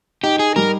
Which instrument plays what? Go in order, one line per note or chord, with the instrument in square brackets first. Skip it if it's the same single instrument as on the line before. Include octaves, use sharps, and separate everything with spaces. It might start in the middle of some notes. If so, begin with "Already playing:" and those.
[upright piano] D#4 [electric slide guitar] G4
[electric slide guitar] G#4
[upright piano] G3 [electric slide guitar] A#4